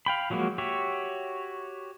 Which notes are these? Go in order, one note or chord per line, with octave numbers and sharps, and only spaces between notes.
F5 G5 B5
F3 F#3 G#3 A#3 F#4
F#4 G4 C#5 E5